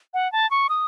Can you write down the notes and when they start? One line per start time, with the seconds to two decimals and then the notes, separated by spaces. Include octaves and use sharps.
0.14 F#5
0.32 A5
0.51 C#6
0.69 D#6